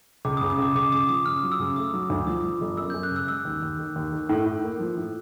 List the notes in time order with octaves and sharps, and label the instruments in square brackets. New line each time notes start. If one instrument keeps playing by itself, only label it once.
[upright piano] C#2 [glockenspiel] D6
[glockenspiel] D#6
[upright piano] C#3
[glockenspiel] D#6
[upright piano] C#2 [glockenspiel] D6
[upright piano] C#2 [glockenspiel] D6
[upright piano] C#3 [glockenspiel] D#6
[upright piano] F3 [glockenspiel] D#6
[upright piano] C#3 [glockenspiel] F6
[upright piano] F#3
[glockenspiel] E6
[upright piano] C#3
[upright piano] A3 [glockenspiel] D#6
[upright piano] F#3
D2
[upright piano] F3 [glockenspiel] D#6
[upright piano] F3
G1
[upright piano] F#2 [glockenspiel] E6
[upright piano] F#2 [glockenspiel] G6
[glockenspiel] F#6
[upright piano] C#3
[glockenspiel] E6
[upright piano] G#3 [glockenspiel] E6
[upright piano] D#2
D#2
D#3
D#2
D#3
A2
A2
A#3
F3
A2